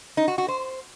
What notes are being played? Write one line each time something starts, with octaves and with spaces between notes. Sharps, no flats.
D#4
F#4
F#4
C5